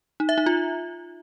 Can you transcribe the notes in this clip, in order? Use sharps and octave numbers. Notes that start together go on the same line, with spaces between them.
D#4
E5
D#4
F4